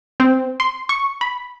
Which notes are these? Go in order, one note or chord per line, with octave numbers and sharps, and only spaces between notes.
C4
C6
C#6
B5